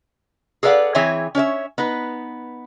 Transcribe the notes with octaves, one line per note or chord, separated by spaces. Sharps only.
G#4 A4 B4 D5 F5 F#5
E3 C4 G#4 C#5 E5 G#5
C#4 C#5 D5 E5
B3 D#4 B4